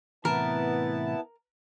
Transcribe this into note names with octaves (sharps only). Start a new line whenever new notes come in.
A2 C3 E3 B3 E4 A#4 A5